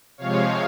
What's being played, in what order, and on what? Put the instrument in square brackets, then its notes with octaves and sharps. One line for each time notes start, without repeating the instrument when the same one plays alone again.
[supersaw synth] C3 F3 G#3 C#5 F5